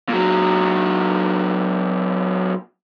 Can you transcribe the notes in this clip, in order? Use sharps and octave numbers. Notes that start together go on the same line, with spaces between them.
A#2 F#3